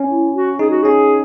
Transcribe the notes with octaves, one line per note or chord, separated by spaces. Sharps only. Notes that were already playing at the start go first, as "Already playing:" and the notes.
Already playing: C#4
E4
F#4
D#4 G#4
F#4
C#4 G#4